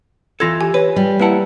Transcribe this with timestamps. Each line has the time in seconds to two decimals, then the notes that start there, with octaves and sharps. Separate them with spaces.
0.40 E3 F4 A4 G#6 A#6
0.61 G4 G#5
0.74 B4 C#5
0.96 G3
1.20 A#3 E4 B4 F#5 A5